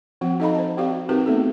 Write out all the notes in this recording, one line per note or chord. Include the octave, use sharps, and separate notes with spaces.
F3 C4 F#4 F#5
D#4 A4 D#5 F5 A#5 B5
C5 A5
C4 F#4 G4 D5 F5
C4 D#4 F#4 G4 A#4 B4
A3 B3 C4 D#4 G#4 A4